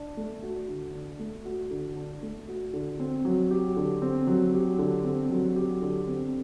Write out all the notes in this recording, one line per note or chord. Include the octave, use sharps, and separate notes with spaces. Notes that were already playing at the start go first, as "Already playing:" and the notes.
Already playing: D4
A3
F#4
D3
D4
A3
F#4
D3
D4
A3
F#4
D3
C4
F#3
G4
D3
C4
F#3
G4
D3
C4
F#3
G4
D3
C4